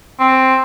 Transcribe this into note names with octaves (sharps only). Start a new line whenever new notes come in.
C4